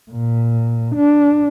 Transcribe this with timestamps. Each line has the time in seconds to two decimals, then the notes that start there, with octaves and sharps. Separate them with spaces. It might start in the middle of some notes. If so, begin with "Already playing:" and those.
0.11 A#2
0.96 D4